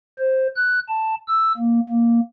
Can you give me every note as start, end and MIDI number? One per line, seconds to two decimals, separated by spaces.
0.18 0.47 72
0.56 0.79 90
0.89 1.15 81
1.28 1.53 88
1.58 1.80 58
1.89 2.20 58